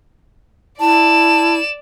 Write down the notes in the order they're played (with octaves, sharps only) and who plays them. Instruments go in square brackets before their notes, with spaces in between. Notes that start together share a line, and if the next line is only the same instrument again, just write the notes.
[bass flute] E4 [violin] D5 E7 [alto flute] A5